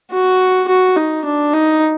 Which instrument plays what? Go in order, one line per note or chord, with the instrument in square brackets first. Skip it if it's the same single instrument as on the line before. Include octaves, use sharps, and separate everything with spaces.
[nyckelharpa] F#4
F#4
D#4
D4
D#4